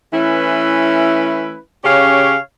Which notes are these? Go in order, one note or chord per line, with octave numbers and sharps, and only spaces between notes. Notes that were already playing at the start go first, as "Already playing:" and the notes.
E3 A3 C#4 E4 B4
C#3 C#4 G4 C#5 F5